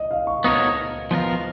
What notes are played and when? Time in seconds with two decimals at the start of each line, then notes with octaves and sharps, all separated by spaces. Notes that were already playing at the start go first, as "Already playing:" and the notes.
Already playing: D#5
0.11 F5
0.27 C#6
0.44 B3 D#4 F#4 A#4 C#5 D#6
1.11 F3 B3 F4 A#4